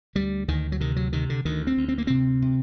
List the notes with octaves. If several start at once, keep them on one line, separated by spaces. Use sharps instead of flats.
D2 G3
D2 D#3
F#3
C3 D#3
F#3
C3 D#3
D3
D2 D#3
C4
D2
C4
A#3
C3 C4
C3